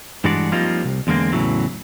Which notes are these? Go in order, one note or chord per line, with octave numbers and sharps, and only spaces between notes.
G2 E3 G#3 D4 F#4 D5
F3 G3 A#3 C4 D#4 F4
C2
E2 D3 G#3 A#3 C4
E2 A2 C#3 E3 F#3